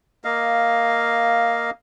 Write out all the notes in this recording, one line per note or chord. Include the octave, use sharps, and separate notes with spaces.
A#3 D#5 F5